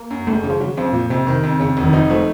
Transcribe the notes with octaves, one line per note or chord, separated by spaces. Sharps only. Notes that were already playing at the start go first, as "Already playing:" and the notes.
Already playing: A#3
F#2
F#1 A3
C#3
F3
C#3 F#3
F2 F3
A#2 F3
F2 C3
C3 D#3
F2
F2 C#3
F1
D#3
F3 D#4
F3 A3